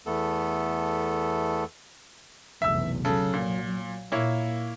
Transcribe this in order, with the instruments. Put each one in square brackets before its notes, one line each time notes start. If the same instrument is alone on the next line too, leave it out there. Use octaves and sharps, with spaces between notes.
[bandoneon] E2 A3 B3 A4
[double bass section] F1 B1 E2 [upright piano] E5 E6
[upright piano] C#3 A4 [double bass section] F#3
[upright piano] A#2
[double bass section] A#2 [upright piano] A#3 E4 C#5